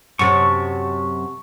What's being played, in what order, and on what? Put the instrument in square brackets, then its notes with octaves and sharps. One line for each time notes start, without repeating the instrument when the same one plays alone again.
[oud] F#2 C3 [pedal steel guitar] A5 C#6